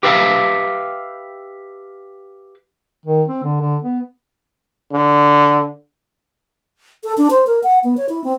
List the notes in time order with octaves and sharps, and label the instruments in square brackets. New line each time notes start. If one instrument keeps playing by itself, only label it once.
[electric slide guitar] G4 B4 E5 F5
[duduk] D#3
C4
D3
D3
B3
[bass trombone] D3
[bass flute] A4
D4
C5
A#4
F#5
B3
C#5
E4
C4